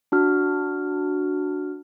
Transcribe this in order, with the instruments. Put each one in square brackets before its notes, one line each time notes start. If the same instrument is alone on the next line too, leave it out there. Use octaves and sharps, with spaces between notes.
[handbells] D4 F#4 F6